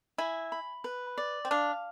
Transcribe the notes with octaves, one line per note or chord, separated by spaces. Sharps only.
E4 G#5
B5
B4
D5
C4
D4 F5